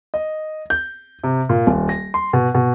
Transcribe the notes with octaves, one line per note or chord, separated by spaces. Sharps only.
D#5
G6
C3
A#2
D#1
A#6
C6
B2
B2